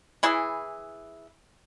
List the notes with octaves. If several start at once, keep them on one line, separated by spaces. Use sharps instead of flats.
E3 E4 G#4